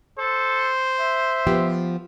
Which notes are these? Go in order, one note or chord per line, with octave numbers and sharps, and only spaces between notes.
A4 C5
E5
F3 B3 G4